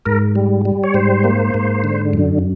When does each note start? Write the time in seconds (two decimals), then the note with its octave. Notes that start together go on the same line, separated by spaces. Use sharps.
0.05 G#2 A#4
0.35 G3
0.65 G3
0.84 C#5
0.94 G#2 C5
1.24 A#3
1.54 G#2
1.84 D3
2.13 F#2